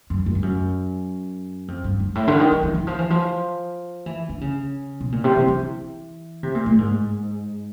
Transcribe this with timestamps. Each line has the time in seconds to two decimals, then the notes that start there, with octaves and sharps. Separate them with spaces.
0.10 F#2
0.26 F#2
0.35 G2
0.43 F#2
1.68 F2
1.84 G2
2.00 G#2
2.15 A2
2.28 D3
2.39 D#3
2.51 D#3
2.63 E3
2.74 E3
2.87 F3
2.99 E3
3.10 F3
4.06 E3
4.29 D3
4.41 C#3
5.01 B2
5.12 A#2
5.24 C3
5.36 E3
5.48 E3
6.43 C3
6.55 A#2
6.66 A2
6.79 G#2